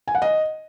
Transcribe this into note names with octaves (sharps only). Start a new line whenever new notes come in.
G#5
F#5
D#5